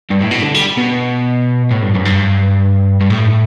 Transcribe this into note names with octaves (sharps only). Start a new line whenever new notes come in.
G2
A2
B2
D3
G3
B2
A2
G2
F#2
G2
G2
A2